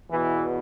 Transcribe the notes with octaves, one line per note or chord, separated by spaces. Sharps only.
E2 B2 E3